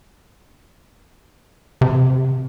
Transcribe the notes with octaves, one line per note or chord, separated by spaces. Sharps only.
C3